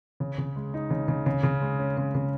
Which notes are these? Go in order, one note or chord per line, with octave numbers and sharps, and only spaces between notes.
C#3
C#3
G#3
D#4
C#3
C#3
C#3
C#3
G#3
C#4
C#3
C#3